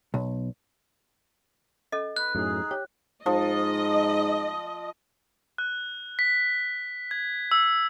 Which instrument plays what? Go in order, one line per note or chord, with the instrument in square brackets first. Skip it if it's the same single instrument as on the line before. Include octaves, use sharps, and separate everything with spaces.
[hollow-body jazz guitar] B1
[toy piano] C#4 A4 D#5
[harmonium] B4 [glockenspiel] F#6
[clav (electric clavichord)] F#2 A2 [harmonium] D#4 G#4
[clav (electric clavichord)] G4 [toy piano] C#5
[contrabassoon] G#2 [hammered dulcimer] F3 [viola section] D#5
[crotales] F#6
B6
G#6
E6